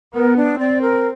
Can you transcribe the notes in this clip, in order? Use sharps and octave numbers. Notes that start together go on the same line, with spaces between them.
B3 A#4
D4
C4 D5
A#4